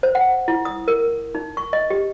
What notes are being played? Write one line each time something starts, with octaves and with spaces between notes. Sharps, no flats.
C5
F#5
E4
D#6
A#4
D#4
C#6
D#5
G4